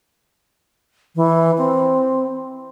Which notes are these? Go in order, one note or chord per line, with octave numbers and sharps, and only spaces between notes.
E3
C4